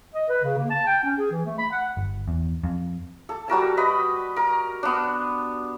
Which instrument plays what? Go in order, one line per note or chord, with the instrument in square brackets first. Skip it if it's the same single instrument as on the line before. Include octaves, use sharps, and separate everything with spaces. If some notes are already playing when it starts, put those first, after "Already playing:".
[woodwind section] D#5
B4
C#3
A#3
A5
G5
C#4
G#4
E3
A3
B5
F#5
[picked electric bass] G1
E2
F2
[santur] A4
G3 F#4 A#4 A5
B4 D#5 B5
A#4
B3 D4